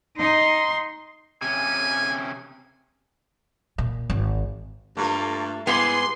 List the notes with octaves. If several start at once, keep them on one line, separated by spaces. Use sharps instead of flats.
D#4 C6
C3 C#4 G#5
A#2
G#1
G2 A3 A#3 F4
G#2 G3 B3 E4 G#4 C6